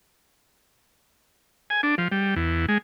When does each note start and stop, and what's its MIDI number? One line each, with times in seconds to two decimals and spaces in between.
1.70 1.81 80
1.83 1.95 62
1.98 2.08 53
2.12 2.35 55
2.36 2.66 40
2.68 2.78 56